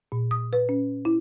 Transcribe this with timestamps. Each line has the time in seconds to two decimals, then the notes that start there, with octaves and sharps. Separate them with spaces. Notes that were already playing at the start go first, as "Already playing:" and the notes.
0.12 A#2
0.31 D#6
0.53 B4
0.69 C#4
1.05 E4